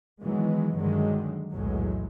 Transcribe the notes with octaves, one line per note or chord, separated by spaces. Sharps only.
D#3 E3 F#3 G#3 B3
G2 D3 D#3 F#3 G#3
B1 E2 A2 F#3 G#3